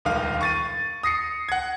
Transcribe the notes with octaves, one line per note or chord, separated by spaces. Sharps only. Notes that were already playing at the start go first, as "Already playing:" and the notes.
D#1 C#2 D#3 F5
C#6 A6 D#7
D#6 A#6 C7 C#7
F#5 G#6